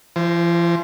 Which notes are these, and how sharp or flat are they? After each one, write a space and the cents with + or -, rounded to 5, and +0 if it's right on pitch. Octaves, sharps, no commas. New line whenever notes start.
F3 -45 C5 +0